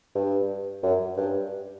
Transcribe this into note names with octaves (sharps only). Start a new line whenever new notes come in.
G2
F#2
G2